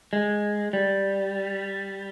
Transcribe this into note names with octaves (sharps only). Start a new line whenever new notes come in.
G#3
G3